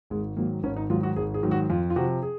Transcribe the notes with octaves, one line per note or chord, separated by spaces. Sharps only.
G#1 G#3
G#2 D#3 F#3 A#3
G#1 C#4
D#4
G#2 D#3 F#3 F4
F#4
G#1 G#4
G#4
G#2 D#3 F#3
F#4
F2 F4
F4
C3 F3 F#4
G#4